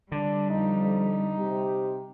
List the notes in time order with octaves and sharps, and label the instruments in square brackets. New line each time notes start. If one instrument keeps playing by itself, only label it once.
[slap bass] D3 [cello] G3 [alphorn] D4
[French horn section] F2 [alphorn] D#4
[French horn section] C3 G4